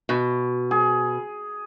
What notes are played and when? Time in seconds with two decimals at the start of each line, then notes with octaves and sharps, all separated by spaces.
0.09 B2
0.71 G#4